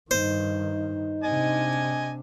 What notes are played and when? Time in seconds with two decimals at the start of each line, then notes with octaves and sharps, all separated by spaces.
0.11 G2 D#3 D#4 C5
1.24 C3 D4 D#5 G#5